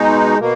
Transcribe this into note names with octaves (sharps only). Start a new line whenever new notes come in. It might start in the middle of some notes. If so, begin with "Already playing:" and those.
Already playing: B2 G#3 D#4
B2 A#3